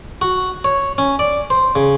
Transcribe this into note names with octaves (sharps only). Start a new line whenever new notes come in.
F#4
C#5
C#4
D5
C5
C#3